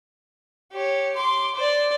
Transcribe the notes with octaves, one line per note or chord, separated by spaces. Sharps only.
G4 C#5
C6 D6
C5 D5